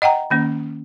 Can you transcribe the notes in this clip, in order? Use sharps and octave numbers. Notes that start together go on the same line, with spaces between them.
D#5 F#5 G5 A#5
D#3 A#3 C#4